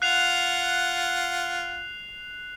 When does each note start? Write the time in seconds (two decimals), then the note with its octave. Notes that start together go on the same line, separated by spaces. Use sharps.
0.02 F4 F#5 F#6 C7 F7